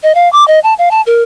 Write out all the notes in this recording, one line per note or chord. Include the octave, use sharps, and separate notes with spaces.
D#5
F5
D6
D#5
A5
F5
A5
A#4